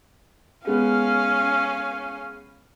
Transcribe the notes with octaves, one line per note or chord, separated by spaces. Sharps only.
G#3 B3 C#4 F5